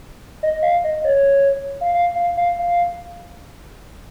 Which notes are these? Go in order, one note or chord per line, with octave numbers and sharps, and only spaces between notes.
D#5
F5
D#5
C#5
F5
F5
F5
F5
F5